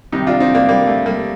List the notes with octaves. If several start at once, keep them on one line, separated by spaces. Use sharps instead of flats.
C2 C3 D#3 D#4 G4
D4 F4
C4 D#4
A#3 D4
G3 A#3
A3
G3 A#3